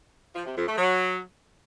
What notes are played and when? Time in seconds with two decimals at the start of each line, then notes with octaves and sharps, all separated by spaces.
0.35 F3
0.45 C3
0.56 F2
0.66 A3
0.77 F#3